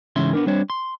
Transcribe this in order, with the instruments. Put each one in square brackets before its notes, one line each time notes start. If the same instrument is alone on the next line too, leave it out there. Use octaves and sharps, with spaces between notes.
[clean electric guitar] G#2 C#3 E3 C#4 E5 C6
B3 D4 A#4
G3 C4 D4 C5 C#5
C6